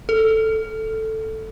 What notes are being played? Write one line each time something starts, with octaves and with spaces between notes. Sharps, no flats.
A4